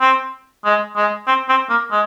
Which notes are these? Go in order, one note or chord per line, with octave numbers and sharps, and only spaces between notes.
C4
G#3
G#3
C4
C4
A#3
G#3